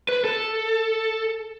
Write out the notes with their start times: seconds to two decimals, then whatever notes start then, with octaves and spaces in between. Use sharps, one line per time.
0.09 B4
0.24 A4